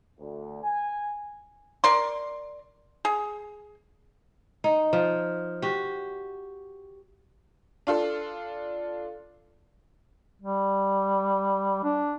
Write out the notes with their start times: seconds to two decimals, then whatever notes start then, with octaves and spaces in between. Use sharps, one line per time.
0.19 D2
0.63 G#5
1.84 A#4 D5 C6
3.05 G#4
4.64 D#4
4.93 F3
5.62 F#4 G4
7.87 D4 F4 A4
10.42 G3
11.84 D4